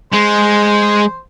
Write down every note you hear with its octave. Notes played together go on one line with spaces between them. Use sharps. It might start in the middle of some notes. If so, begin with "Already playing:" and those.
G#3 C5